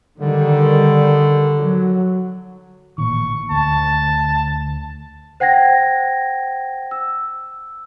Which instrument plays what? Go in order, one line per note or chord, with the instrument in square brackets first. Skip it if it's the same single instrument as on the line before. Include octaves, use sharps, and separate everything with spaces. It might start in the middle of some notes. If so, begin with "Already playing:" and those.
[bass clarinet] D3 [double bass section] D#3 G3
[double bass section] F#3
[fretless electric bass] A1 A#2 D#3 [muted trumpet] C#6
[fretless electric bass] D2 [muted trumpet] A5
[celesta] C5 F#5 G5 G#6 A#6
E6